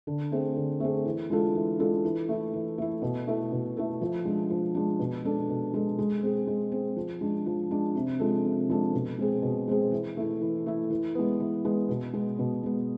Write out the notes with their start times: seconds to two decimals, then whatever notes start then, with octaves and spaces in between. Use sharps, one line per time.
0.07 D3
0.32 A3 C4 G#4
0.56 D3
0.80 A3 C4 G#4
1.05 E3
1.30 G#3 D4 F4 A4
1.55 E3
1.79 G#3 D4 F4 A4
2.04 E3
2.29 A3 E4
2.53 E3
2.78 A3 E4
3.02 B2
3.27 A3 E4 A4
3.52 B2
3.77 A3 E4 A4
4.01 F3
4.25 G#3 D4
4.50 F3
4.74 G#3 D4
4.99 B2
5.24 G#3 D4 A4
5.49 B2
5.74 G#3 D4 A4
5.99 G#3
6.23 C4 G#4
6.47 G#3
6.72 C4 G#4
6.96 F3
7.21 G#3 D4
7.46 F3
7.71 G#3 D4
7.95 C3
8.19 F3 G#3 D4 A4
8.44 C3
8.69 F3 G#3 D4 A4
8.93 B2
9.18 G#3 C4 G#4
9.42 B2
9.68 G#3 C4 G#4
9.91 E3
10.17 A3 E4
10.41 E3
10.66 A3 E4
10.90 E3
11.15 G#3 B3
11.40 E3
11.65 G#3 B3
11.89 B2
12.13 G#3 B3
12.39 B2
12.63 G#3 B3